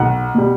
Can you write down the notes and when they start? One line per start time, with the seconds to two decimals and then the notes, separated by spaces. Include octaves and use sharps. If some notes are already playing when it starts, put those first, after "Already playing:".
Already playing: B1 F#5
0.35 B2 G3